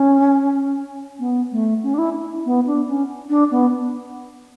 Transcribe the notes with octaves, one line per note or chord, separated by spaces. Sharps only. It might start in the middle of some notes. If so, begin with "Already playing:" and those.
Already playing: C#4
B3
A3
C#4
D4
E4
B3
D4
C#4
D4
B3